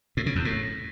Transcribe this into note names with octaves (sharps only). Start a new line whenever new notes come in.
A2
C#3
E2
A2